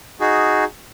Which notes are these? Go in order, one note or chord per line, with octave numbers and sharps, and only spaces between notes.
D#4 F#4 G#4